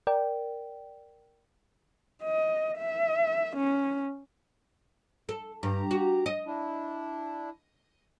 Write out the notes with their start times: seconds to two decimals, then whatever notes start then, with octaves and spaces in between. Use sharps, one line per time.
0.07 A#4 D5 G5
2.23 D#5
2.78 E5
3.56 C#4
5.29 A4
5.63 G2 G4 A#5
5.91 F#4
6.26 D#5
6.47 D4 E4